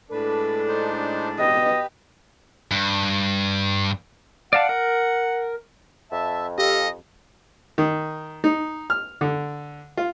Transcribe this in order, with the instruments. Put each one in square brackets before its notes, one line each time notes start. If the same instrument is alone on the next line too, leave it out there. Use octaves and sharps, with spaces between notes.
[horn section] A2 G#3 D4 [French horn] A4 [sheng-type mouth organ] B4
[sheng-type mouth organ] D#4 C5
[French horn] B2 [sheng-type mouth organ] G4 B4 [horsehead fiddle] D#5
[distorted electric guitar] G2
[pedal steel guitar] D5 F5 A5 [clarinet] F#5
[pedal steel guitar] A#4
[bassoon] F2 [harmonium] E5 A5
[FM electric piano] G4 [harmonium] A4 F5 [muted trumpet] D#5
[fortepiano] D#3
D#4
F6
D3
F4